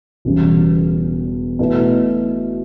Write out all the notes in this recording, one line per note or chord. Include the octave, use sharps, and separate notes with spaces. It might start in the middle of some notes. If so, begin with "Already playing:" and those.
E1 E2 C#3 G3
B2 A3 E4